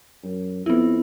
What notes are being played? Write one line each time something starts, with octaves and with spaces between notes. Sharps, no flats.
F#2
F2 B3 E4